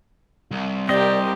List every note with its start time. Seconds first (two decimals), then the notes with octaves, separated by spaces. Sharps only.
0.52 C2
0.89 C4 G4 A#4 D5 D#5